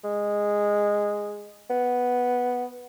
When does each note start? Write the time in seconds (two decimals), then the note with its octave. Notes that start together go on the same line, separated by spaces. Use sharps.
0.04 G#3
1.70 B3